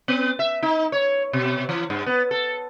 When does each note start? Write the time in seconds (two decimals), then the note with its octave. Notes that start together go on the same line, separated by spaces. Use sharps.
0.08 B3
0.39 E5
0.63 D#4
0.92 C#5
1.33 B2
1.69 E3
1.90 G2
2.06 B3
2.31 A4